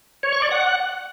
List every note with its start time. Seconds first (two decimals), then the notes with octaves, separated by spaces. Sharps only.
0.23 C#5
0.33 C#6
0.42 D5
0.51 F#5